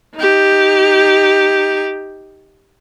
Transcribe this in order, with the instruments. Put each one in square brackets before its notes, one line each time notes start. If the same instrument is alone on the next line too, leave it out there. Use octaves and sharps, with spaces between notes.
[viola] D#4 G4